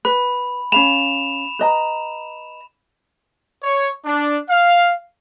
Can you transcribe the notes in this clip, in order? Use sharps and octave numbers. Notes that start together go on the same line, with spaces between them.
B4 B5
C#4 F5 B5 E7 F7
B4 D#5 A#5
C#5
D4
F5